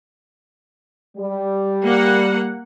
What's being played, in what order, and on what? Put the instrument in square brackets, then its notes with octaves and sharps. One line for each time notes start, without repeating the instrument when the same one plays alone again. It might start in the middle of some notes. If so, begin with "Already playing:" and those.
[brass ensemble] G3
[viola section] A#3 F#5